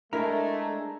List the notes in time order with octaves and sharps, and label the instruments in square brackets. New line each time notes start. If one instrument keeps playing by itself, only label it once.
[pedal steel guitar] G#3 A#5 [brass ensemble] A3 [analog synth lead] D4 [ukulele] E4 A#4